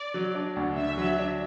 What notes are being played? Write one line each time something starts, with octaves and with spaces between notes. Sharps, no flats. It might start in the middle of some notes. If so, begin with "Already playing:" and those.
Already playing: D5
F#3
D4
D2
D3 E5
F#3
D4